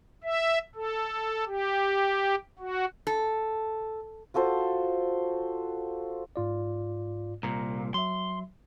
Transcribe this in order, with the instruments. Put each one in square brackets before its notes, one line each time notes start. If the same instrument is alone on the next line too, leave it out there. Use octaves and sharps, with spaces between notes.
[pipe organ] E5
A4
G4
F#4
[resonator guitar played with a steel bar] A4
[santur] F4 F#4 A4 C5
[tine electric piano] G#2 F4 D5
[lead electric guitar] C2 A#2 [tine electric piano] A#5
[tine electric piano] F#3 E5 [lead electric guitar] C6